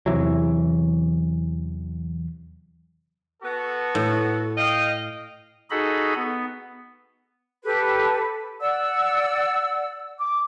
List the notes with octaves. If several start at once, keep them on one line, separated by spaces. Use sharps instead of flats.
E2 C3 E3 F#3
B3 F#4 A4
A2
D#5 F5 G5
D#4 F#4 G#4 A4 D#5 B5
B3
G4 A4 B4
D5 F#5 E6
D6